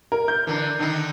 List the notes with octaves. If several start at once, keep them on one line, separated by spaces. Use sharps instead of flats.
A#4
G6
D3 E3
D3 D#3 D#4